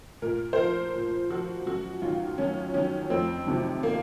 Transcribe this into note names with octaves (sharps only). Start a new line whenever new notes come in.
A#2 A#4
C5
F3 A#4
A#2
F3 F#4
F#2 F#4
D#3 F#3 F4
F#2 C#4
D#3 F#3 C#4
F2 C4
C3 D#3 F#3
A#3